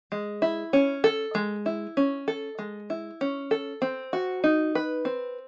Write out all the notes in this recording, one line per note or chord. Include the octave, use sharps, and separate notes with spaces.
G#3
E4
C#4
A4
G#3
E4
C#4
A4
G#3
E4
C#4
A4
C4
F#4
D#4
B4
C4